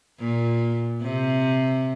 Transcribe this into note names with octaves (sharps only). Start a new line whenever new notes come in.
A#2
C3